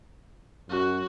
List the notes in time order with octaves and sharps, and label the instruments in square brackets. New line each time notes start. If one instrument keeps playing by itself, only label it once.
[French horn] F#2 [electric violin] F#4